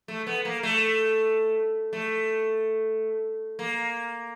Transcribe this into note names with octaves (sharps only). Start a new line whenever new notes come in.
A3
B3
A#3
A3
A3
A#3